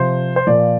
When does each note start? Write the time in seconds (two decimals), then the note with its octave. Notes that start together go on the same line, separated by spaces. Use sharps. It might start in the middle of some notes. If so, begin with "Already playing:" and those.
Already playing: C3 F3 C5
0.36 C5
0.47 A#2 F3 D5